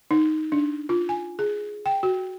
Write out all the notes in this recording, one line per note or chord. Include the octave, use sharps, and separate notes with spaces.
D#4
D4
F4
G#5
G#4
G5
F#4